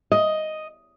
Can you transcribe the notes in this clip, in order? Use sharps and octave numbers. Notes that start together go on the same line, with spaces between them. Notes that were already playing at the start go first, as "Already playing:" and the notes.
D#5